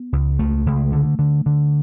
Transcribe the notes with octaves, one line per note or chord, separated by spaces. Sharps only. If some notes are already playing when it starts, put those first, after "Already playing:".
Already playing: B3
C#2
C#2 A3
C#2
D3
D3
D3